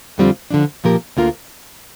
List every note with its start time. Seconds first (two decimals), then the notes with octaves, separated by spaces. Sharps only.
0.18 F2 D3 G3 C4 F4
0.51 D3 F3 D4
0.84 A#2 F3 A#3 G4 A#4
1.17 D2 D3 A#3 F4 A#4